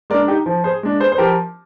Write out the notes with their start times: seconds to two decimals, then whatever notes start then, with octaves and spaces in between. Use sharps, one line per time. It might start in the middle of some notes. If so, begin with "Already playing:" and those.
0.10 G#3 A#4 D5
0.14 D4
0.28 D#4 G4
0.46 F3
0.64 G#4 C5
0.83 G#3 D4
1.00 G#4 C5
1.12 C5
1.18 F3 G4 A#4